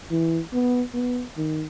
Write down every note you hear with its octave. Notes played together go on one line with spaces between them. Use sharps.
E3
B3
B3
D#3